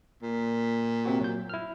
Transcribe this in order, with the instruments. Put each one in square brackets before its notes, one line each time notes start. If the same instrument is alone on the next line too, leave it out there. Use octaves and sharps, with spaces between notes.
[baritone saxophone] A#2
[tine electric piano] C3 C4 F#4
F#3 G6
E4 F6